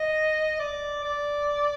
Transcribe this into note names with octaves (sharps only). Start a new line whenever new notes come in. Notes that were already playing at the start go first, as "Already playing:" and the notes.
Already playing: D#5
D5
D5